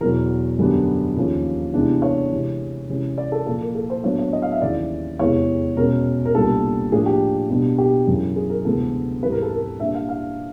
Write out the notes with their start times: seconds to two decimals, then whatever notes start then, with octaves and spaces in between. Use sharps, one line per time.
0.01 E2 B2 F#3 A#4
0.59 F#2 D3 G3 B3 D4
1.16 D#2 C#3 F3 A#3 C#4
1.74 C3 E3 G#3 B3 D4
2.02 C#5
2.31 C3 E3 G#3
2.89 C3 E3 G#3 C#4
3.18 D5
3.32 A4
3.46 A#2 F3 A#3 A4
3.61 A#4
3.75 A4
3.90 C5
4.04 A2 F#3 B3 D4 C#5
4.19 C#5
4.33 D#5
4.42 F5
4.52 E5
4.61 D#2 C#3 E3 D5
5.19 E2 C3 E3 G#3 B3 C#5
5.77 B2 G#3 C#4 A#4
6.25 A#4
6.34 C2 A#2 G3 B3 D4 A4
6.92 A2 F3 A#3 D4 G#4
7.06 G4
7.49 B2 G3 B3 D4
7.78 G4
8.07 F#2 C#3 E3
8.36 G#4
8.50 A#4
8.65 D2 C3 E3 G#3 B3 A4
9.23 G#2 E3 G3 C4 B4
9.32 A#4
9.42 A4
9.53 A#4
9.80 A#2 G3 A#3 D4 E5
9.94 F5
10.09 F5